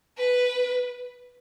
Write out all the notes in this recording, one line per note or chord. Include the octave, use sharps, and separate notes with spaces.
B4